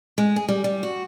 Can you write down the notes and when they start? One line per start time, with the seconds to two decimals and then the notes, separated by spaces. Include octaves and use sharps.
0.18 G#3
0.36 G#4
0.48 G3
0.64 G3
0.83 F#4